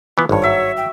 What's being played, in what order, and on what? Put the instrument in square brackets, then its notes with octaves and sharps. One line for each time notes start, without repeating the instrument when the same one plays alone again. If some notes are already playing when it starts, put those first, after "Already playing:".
[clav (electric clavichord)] E3 B3 [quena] F4
[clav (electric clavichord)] G#1 G2 [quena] C#5
[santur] F#3 E5
[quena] G5